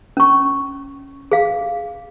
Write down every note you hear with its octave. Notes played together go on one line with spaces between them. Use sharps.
C#4 C#6
G#4 F5